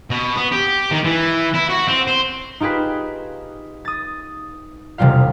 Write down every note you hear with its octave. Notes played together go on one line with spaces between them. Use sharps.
B2
B3
G4
D#3
E3
E4
F#4
C4
C5
D#4 F4 G4 G#4 B4
D#6 A6
E1 C3 G3 F4 F5